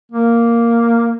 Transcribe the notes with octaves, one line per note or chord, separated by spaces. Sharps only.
A#3